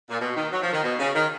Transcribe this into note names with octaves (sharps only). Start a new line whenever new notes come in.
A#2
B2
D#3
F#3
F3
D#3
B2
C#3
D#3